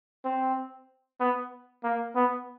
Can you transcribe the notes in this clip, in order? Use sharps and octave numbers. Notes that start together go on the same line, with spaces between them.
C4
B3
A#3
B3